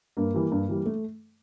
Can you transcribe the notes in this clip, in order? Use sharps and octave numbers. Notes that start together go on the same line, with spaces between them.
G2 A#3
E3 G3
G2
E3 G3
A3